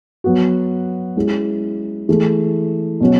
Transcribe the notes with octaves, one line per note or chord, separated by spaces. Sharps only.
F#3 B3 F#4
G#3 C#4 E4 G#4
E3 A3 E4 G#4
B2 F#3 C#4 F#4